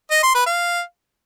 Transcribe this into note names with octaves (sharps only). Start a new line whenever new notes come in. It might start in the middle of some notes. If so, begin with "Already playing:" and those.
D#5
C6
B4
F5